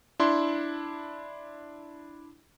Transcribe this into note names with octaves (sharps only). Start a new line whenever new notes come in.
D4 E4 C6